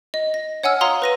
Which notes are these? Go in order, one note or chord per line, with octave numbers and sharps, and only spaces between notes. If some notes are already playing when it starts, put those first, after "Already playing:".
D#5
A#6
C#5 F#5 G#5 E6 F6
C#5 F5 A#5 C6 D#6
B4 A#6 D#7